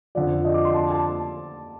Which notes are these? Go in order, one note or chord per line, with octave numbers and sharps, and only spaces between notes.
F2 D3 F3 D5
D#5
D6
C6
A5
A5